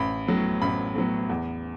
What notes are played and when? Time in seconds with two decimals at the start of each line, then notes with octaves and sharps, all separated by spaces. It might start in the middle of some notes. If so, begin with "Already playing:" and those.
Already playing: A1 B5
0.27 A2 F#3 B3
0.62 A1 B5
0.95 A2 F#3 B3
1.29 E2